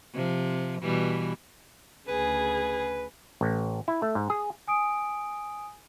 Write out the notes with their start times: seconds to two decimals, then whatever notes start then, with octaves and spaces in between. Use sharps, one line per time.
0.14 C3 F3
0.82 B2 E3 G3
2.08 D2 C#3 G#4 B4
3.41 A1
3.88 E4
4.02 A3
4.15 G#2
4.30 G#4
4.68 G#5 D#6 D7